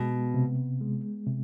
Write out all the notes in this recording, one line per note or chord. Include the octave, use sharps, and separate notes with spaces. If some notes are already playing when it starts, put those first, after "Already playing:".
Already playing: B2 G#3
C3
G#3
C3